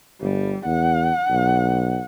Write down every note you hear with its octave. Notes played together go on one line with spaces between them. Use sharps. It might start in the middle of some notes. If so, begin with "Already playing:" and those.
G1 G3
E2 F#5
B1